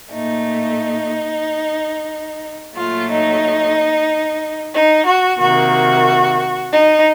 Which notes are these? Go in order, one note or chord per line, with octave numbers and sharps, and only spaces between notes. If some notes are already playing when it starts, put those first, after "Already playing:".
A#2 A3 D#4
A#2 F#3 A3 F4
D#4
D#4
F#4
C3 D#3 A#3 F#4
D#4